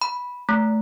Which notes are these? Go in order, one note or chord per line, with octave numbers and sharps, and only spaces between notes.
B5
A3